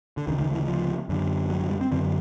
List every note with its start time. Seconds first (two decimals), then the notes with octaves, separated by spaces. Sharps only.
0.17 D3
0.27 D2 D#3
0.30 C#3
0.41 D#3
0.54 E3
0.68 F3
1.09 F#2 D3
1.50 F#3
1.60 F#3
1.71 G3
1.81 C4
1.92 F#2 D3 C4